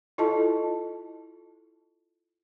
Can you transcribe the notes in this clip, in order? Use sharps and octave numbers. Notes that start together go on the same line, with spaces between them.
E4 F4 A4 D#5 A5